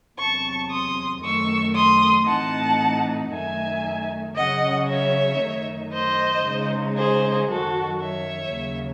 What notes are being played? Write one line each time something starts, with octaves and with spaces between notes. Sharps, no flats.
E2 C3 F#3 A5 C#6
C6 D#6
F#2 D#3 A3 C#6 E6
C6 D#6
A2 E3 C4 D#4 F#5 A5
F#2 D#3 A3 D#4 E5 G#5
C#3 F#3 C#4 D#5 F#5
C#5 E5
F#2 D#3 A3 D#4
C5 D#5
C#3 G#3 D#4
G#4 C5
F#2 D#3 F#3 F#4 A4
C#5 E5
D#2 C#3 F#3